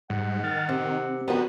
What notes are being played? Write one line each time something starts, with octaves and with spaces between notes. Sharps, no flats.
G#2 G3 F#5
D#3 F6 A6
C3 C4
D3 F3 B3 F#4 A#4 G5 A#5